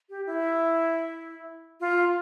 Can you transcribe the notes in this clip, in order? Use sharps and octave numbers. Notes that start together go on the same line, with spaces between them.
G4
E4
F4